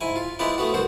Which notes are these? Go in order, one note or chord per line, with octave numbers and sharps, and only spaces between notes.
G#2 E4 G#5
F4
G#3 C4 E4 F4 B4 D5
A3 B3 F#4
C2 G2 F#4 C5